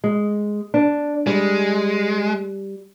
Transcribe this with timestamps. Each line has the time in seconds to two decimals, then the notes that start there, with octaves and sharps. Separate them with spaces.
0.04 G#3
0.74 D4
1.27 G3 G#3